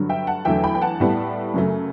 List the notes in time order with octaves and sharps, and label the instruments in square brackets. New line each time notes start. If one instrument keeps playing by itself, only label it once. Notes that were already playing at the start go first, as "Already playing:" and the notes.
Already playing: [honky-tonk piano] G2 D3 F#3
E5 G5
F#5 A5
E2 D3 F#3 A3 E5 G5
G5 B5
G5
F#5 A5
A2 G3 B3
F#2 C#3 F#3 A3